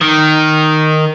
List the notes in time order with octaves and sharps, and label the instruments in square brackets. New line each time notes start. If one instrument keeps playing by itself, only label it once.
[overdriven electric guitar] D#3